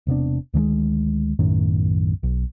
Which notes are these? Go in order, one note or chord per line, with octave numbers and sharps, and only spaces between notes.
E1 C3 B3 D4
D2 D#3 F3 G#3
B1 F#2 A2 D#3
B1